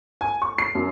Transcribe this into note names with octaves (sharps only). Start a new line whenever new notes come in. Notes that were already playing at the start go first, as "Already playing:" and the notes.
G#5
C#6
C7
F#2